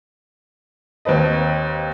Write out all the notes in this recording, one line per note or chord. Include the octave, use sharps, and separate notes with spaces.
D#2 C4 B4 D#5